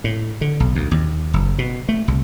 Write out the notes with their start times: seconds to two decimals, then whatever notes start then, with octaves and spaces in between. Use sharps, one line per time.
0.04 A2
0.41 D3
0.60 B1
0.75 D2
0.91 D#2
1.34 F#1
1.59 B2
1.89 A3
2.08 C2